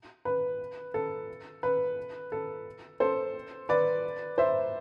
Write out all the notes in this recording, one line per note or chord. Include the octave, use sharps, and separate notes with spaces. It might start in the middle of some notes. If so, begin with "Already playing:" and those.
B4
A4
B4
A4
A4 C5
B4 D5
C5 E5